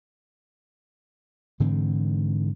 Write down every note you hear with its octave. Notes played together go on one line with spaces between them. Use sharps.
G#2 D3 E3 C4